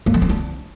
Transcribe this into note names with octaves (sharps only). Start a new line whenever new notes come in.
A#3
F3
C4
D4